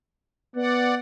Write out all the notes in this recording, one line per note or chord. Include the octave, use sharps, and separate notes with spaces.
B3 D5 F#5